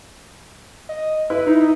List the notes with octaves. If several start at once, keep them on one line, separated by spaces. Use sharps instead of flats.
D#5
E4 B4
D#4